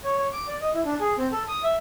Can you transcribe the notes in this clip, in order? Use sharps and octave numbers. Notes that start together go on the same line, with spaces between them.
C#5
C#5
D6
D5
D#5
E4
D4
G#4
C4
A4
D#6
E5